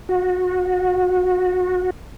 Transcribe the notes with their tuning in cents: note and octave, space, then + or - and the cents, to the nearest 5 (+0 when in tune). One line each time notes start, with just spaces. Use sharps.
F#4 -25